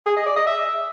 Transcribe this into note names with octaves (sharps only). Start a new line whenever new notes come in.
G#4
D#5
D5
D#5
E5